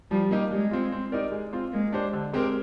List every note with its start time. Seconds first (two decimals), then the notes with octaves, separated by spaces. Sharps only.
0.11 F3 G3
0.31 A#3 D#4 G4
0.51 G3 G#3
0.71 C4 F4
0.92 C4
1.12 D#4 G4 A#4 D5
1.32 G#3
1.53 C4 F4
1.72 G#3 A#3
1.93 D4 G4 C5
2.13 D3
2.33 G#3 C4 G4 A#4